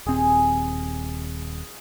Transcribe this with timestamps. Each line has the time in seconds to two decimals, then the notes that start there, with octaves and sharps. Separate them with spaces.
0.06 D#1 C4 G#4